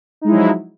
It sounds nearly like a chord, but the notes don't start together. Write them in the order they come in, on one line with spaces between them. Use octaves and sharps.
D#4 G#3 E4 F#3 F3